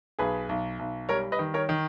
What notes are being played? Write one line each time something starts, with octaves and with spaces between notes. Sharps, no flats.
B1 G#4 B4
B1
B1
G3 A#4 C#5
B4 D#5
D#3
A#4 C#5
D#3